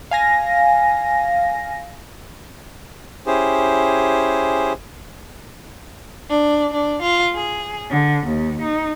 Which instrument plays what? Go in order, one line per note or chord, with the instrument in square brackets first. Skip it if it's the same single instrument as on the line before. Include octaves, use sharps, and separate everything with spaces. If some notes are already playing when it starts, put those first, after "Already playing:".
[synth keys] F5 G#5 A#6
[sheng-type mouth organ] C#4 E4 G4 G#4 C5
[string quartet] D4
D4
F4
G#4
D3
D#2
D#4